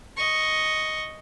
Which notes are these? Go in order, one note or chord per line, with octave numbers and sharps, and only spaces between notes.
D#5 C#6